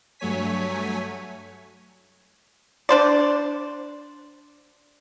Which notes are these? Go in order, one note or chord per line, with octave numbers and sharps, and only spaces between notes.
G2 F#3 A3 C#5 G#5 B6
D4 C5 D5